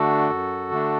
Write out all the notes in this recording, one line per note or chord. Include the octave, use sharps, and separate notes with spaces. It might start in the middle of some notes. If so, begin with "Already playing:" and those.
Already playing: D3 A3 D4 F#4 A4
F#2
D3 A3 D4